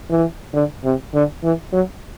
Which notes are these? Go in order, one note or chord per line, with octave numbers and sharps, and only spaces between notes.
E3
D3
C3
D3
E3
F#3